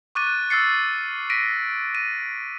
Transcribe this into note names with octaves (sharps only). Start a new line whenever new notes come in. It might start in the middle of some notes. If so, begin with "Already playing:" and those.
C#6 D6 F#6 A6 D#7
E6 F6 A6 C7 C#7
A#6 B6 D7 D#7
D#7